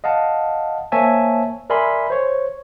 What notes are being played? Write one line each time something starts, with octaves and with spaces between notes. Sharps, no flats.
D#5 F5 F#5 A5
A#3 C5 C#5 E5 G#5 A5
A#4 D5 E5 G#5 B5 C6
C5 C#5